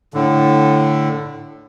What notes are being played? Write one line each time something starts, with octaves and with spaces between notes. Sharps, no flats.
A2 D3